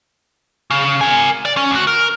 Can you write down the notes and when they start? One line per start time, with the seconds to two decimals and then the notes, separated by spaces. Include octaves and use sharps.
0.71 C#3
1.01 A#4 G#5
1.45 D5
1.57 C#4
1.71 D2 F#4
1.87 A#4